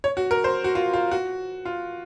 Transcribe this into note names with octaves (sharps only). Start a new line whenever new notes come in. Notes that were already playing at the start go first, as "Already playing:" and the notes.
C#5
F#4
A#4
C5
F#4
F4
F4
F#4
F4